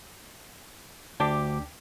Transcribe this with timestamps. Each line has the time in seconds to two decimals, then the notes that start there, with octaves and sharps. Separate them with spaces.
1.20 D2 D4 G4 D6